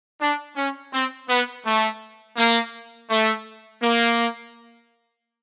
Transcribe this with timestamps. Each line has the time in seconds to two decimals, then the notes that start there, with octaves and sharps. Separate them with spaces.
0.21 D4
0.56 C#4
0.93 C4
1.29 B3
1.65 A3
2.37 A#3
3.09 A3
3.82 A#3